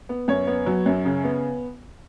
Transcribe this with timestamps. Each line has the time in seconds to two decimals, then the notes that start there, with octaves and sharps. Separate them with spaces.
0.09 B3
0.28 F#2 C#5
0.47 B3
0.66 F#3
0.86 F#2
1.05 C#3
1.24 B3